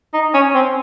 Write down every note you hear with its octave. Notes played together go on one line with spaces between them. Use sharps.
D#4
C#4
C4